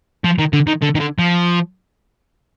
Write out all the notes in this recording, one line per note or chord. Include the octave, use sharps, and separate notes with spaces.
F3
D#3
D3
D#3
D3
D#3
D3
F3